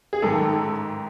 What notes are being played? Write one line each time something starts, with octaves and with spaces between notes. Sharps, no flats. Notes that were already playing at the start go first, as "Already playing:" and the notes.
G#4
A1 G#2 D#3 A4